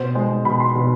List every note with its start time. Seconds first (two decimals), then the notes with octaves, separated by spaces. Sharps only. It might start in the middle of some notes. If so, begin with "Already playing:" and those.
Already playing: B2 C5
0.15 G#3
0.45 B2 B5
0.60 C6
0.75 B2